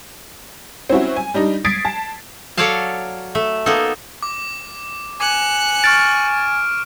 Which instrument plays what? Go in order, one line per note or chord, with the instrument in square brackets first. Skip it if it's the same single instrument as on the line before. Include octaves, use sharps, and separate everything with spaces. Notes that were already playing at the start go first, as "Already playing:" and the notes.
[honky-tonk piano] C4 C#4 E4 F#4
G#5
G3 D4 D#4
D#6 G#6 A6 B6 C7 D7
A5
[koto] F#3 A4 C#5 D5 F5 A5
A3 E5
A#3 B3 D#4 A4
[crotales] D6
[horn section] G#5 [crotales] D6 [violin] F#6 C#7
[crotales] C#6 F6 D7 [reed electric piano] A6